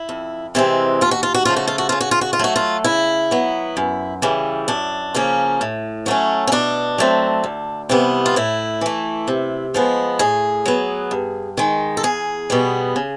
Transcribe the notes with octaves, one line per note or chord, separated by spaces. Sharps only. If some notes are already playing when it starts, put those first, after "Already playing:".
Already playing: E4
F2
C3 E3 G#3 C4
D#2 F4
F#4
F4
F#4
C#3 F3 A3 F4
F#4
F4
F#4
C#3 F4
F#4
F4
F#4
F4
F#3 A3 F#4
F4
C#3 E4
F#3 B3
F#2
C#3 E3 G3
F#2 D4
C#3 F3 A#3 C#4
A2
F#3 A3 C#4
C#4
B2 D4
F#3 A3 C4
D2
C3 E3 G3 B3
F4
A2 E4
E3 A3
C3
F3 G#3 B3
A2 G#4
F#3 B3
G2
D#3 G#3
A4
E2 G#4
B2 G3 B3
C#3